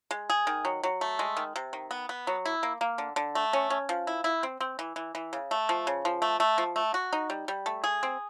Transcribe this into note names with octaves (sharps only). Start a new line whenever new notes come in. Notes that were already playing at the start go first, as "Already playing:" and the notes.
G#3
G#4
D#3
F#3
F#3
A3
G#3
D#3
C3
D#3
B3
B3
F#3
E4
A#3
A#3
D3
D3
A3
C#4
C#4
F3
E4
E4
C4
C4
E3
E3
E3
C#3
A3
F3
C#3
F3
A3
A3
F3
A3
F#4
D#4
G3
G3
A3
G#4
C4